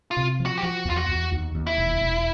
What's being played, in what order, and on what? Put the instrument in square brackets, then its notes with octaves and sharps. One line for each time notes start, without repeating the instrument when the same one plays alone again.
[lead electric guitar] F4
[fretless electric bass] C3
F3
[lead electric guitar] F#4
G4
[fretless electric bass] F3 [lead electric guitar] F#4
[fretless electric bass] E2 [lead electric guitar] F4
[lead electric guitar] F#4
[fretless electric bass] E2
D#2
D#2
[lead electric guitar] E4
[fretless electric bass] E1
E1